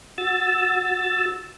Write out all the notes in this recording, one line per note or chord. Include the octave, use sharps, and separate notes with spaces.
F#4 E6 A6